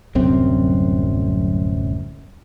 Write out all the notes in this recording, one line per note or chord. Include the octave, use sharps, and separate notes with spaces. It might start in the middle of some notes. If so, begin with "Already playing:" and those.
D1 C2 F#2 C4